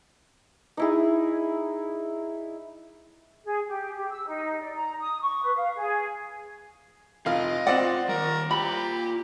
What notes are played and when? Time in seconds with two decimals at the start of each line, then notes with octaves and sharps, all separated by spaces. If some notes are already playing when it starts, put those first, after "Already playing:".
0.77 D#4 E4 G#4
3.45 G#4
3.68 G4
3.96 G4
4.11 E6
4.27 D#4
4.60 D5
4.74 A#5
5.00 D#6
5.22 C#6
5.43 B4
5.55 F5
5.76 G#4
7.26 F1 F4 D#5 F5
7.67 C4 D5 F#5
8.09 D#3 G3 A#4
8.51 F4 G4 A#5 B5